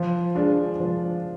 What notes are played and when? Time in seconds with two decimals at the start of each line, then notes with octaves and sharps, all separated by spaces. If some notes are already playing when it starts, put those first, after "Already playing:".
Already playing: F3
0.35 G#3 D4 F4
0.80 F3